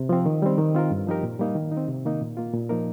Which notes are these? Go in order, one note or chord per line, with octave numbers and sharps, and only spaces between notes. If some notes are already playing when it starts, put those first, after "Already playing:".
Already playing: C3
F3 C4
D#3
G3 C4
D#3
C4 F4 A#4
G2
F3 D#4 G4 A#4
A#2
G3 A#3 D#4
D#3
D#4
C4
C3
D#3 A#3 D#4
A#2
A#3 F4
A#2
F3 A#3 D#4 A#4